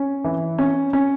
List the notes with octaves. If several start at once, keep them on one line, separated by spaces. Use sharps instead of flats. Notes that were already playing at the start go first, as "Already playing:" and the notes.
Already playing: C#4
E3
C#4
C#4